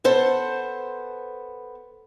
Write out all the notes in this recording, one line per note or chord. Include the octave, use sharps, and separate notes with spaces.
B3 A4 C5 A5